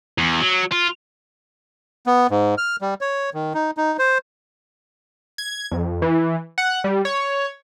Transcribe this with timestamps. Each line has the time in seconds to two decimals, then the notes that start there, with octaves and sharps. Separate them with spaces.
0.18 E2
0.41 F#3
0.72 F4
2.07 B3
2.31 G#2
2.58 F6
2.81 G3
3.01 C#5
3.34 D#3
3.54 D#4
3.77 D#4
3.99 C5
5.38 G#6
5.71 F2
6.02 E3
6.58 F#5
6.84 G3
7.05 C#5